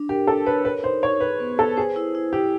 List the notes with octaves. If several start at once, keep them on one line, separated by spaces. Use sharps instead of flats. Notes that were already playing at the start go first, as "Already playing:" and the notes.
Already playing: D4
G4 A#4
D4 A4
B4 C#5
A#4 B4
D#4 C5
D#4 C#5
G#4 B4
B3
A4 B4
G#4 C5
E4
E4
E4 G4